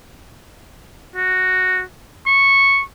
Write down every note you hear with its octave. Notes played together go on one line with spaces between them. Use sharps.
F#4
C#6